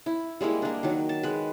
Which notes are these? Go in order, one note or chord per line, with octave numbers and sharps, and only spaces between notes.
E4
G3 G#3 A#3 E4
A#3 D4
D#3 F#3
A5
G#3 B4